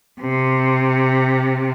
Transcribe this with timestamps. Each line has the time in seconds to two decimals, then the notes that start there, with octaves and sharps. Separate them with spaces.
0.20 C3